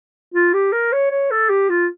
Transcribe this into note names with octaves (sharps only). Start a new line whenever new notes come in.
F4
G4
A#4
C#5
C#5
A4
G4
F4